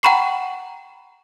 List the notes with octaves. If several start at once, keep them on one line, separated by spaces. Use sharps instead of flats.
F#5 G5 A#5 B5 C#6 C7